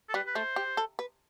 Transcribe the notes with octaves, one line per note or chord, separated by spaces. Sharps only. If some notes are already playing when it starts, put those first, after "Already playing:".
A4
G3 B4
B4
A3 C5
G4
A4
B4